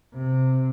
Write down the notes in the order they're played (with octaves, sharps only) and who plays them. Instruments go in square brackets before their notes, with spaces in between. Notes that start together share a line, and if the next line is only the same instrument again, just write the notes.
[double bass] C3